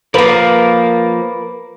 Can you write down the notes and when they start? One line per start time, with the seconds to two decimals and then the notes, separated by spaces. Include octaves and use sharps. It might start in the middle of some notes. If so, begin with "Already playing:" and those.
0.14 F3 A#3 A#4 B4